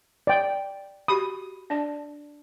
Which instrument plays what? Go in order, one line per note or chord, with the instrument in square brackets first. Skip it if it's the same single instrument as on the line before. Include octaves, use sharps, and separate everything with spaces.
[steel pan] D5 G5
[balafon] F#4 G4 B5 [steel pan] D#6
[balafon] D4 D5 A5